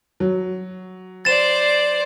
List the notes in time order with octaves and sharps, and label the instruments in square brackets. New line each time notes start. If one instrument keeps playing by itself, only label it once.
[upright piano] F#3
[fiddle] C5 D5 [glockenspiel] A6 E7